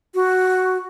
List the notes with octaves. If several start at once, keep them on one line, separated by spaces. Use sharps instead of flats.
F#4